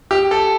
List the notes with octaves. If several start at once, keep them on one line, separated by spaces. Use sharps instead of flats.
G4
A4